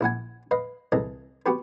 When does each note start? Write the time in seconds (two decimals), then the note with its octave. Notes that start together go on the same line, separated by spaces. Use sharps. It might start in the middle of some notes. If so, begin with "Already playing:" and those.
0.01 A#1 E4 F#5 G#5
0.51 B4 D#5 F5
0.92 C2 E3 G#4 A4 D#5 A#5
1.46 B3 F#4 G4 B4